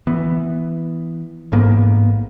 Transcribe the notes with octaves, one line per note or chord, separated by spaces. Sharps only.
E3 B3
A1 G#2 A#3 B3